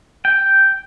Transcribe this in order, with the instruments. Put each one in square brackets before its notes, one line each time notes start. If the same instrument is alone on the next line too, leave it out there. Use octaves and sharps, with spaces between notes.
[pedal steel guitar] G5